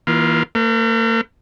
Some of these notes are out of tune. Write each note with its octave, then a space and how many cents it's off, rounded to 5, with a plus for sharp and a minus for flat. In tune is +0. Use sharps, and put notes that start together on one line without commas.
E3 -20 A#3 +30 F4 -10
A#3 -40 B4 +25